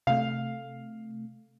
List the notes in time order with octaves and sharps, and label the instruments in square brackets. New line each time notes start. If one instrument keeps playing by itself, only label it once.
[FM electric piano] C3 A3 [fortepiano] F5